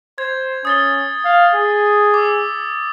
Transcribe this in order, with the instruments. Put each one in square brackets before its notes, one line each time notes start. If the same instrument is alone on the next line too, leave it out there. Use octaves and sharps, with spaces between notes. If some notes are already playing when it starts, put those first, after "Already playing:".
[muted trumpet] C5 [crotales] G#6
[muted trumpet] C#4 [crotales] D#6 A6 G7
[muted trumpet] F5
G#4
[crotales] D6 E6